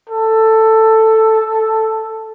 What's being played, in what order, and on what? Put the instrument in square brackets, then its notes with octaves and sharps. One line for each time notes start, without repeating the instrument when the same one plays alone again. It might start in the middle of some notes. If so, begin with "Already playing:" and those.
[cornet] A4